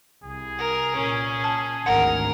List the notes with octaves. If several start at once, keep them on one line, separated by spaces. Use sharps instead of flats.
C2 G#4
A#4
A#2 C#4
A5
G#1 D2 A#4 F#5